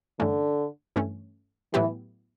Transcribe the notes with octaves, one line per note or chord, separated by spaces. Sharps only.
G2 D3 E3 A3 C#4
G2 E3 A3 C#4
A2 E3 F#3 B3 E4 G4